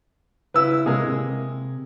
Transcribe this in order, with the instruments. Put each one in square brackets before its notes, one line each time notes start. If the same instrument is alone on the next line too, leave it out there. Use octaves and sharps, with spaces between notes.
[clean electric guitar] C#2 E4 [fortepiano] B4 E6
[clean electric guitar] C3 [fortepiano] G#3 A#3 G#4
[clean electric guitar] C3